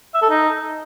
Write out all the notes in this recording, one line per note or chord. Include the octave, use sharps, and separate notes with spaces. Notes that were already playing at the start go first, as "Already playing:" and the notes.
E5
A4
D#4